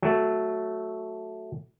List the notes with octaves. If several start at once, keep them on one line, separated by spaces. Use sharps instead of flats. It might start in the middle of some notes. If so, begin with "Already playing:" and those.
F#3 A3